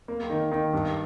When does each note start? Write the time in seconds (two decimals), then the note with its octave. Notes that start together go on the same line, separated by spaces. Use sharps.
0.08 A#3
0.30 D#3
0.51 D#3
0.73 G2